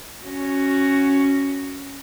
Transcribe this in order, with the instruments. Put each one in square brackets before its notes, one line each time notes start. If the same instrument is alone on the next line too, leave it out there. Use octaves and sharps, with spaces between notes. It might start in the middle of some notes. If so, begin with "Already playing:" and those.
[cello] C#4 F#4